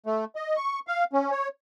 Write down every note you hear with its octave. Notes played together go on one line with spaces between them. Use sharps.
A3
D#5
C#6
F5
C#4
C#5